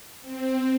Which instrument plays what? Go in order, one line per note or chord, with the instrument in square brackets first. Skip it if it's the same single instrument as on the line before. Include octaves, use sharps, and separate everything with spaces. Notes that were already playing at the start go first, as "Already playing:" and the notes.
[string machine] C4